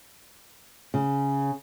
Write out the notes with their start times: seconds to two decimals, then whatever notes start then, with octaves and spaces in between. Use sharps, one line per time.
0.94 C#3